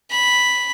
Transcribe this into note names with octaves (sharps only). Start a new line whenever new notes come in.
B5